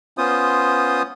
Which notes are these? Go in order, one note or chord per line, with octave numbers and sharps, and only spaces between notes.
B3 C#4 F4 C5 D#6